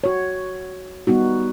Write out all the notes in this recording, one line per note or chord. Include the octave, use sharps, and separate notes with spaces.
F#4 C#5
G3 B3 D#4 F#4